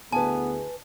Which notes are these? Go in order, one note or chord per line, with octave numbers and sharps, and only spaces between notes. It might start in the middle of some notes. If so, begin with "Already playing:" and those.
D2 B3 E4 G#4 B4 G#5 A5